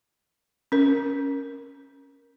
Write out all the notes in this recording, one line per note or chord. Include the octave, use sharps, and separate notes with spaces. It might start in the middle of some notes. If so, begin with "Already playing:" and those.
C#4 A#4